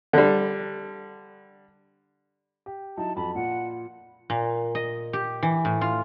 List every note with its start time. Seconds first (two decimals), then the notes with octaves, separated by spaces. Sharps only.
0.13 D3 G3
2.66 G4
2.97 F#3 D#4 E4 A5
3.16 F2 F#3 A5 B5
3.35 A#2 F4 F#5
4.30 A#2
4.75 D#5
5.13 G4
5.43 E3
5.65 A2
5.81 F4